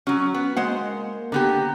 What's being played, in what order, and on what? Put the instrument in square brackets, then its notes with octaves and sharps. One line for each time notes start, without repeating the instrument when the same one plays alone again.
[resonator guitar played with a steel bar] F#3 C#4 [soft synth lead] F#4
[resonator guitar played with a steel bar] B3
[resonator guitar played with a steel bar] G#3 C5 F#5 [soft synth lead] A#3
[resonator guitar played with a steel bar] D3 B3 G4 [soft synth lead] A#5